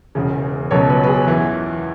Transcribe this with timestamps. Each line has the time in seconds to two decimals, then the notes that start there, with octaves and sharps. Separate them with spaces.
0.15 E1 E2 C#3
0.71 C#2 B2 F#3 C#5
0.89 B4
1.04 B4
1.08 G#4
1.27 E2 E3